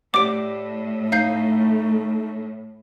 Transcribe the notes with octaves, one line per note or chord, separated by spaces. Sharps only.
A2 G4 D5 F#5 D6 D7
A3 D#4 F5 G6 C7